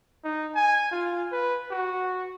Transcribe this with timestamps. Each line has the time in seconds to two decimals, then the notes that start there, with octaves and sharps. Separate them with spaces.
0.24 D#4
0.55 G#5
0.91 F4
1.32 B4
1.71 F#4